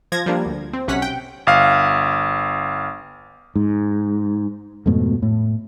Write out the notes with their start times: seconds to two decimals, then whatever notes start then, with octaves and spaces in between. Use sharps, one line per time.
0.12 F3 G#6 A#6
0.26 F3 G3 A#3 D4
0.45 D2
0.73 C4
0.87 B1 C3 C#4 F#5 B6
1.02 G5
1.47 G1 F5
3.56 G#2
4.86 F2 G#2 B2 A3
5.22 A2